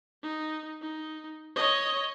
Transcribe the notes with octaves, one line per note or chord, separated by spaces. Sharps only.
D#4
D#4
C#5 D#5